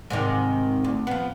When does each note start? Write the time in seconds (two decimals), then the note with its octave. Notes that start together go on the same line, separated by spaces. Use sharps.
0.10 G#2 C3 D#3
0.84 D2
1.07 F3 B3